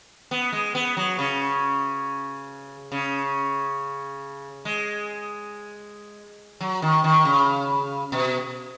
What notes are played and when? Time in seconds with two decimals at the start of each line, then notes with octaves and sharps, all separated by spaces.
0.31 B3
0.53 G#3
0.75 B3
0.97 F#3
1.19 C#3
2.92 C#3
4.65 G#3
6.61 F#3
6.82 D#3
7.04 D#3
7.25 C#3
8.12 B2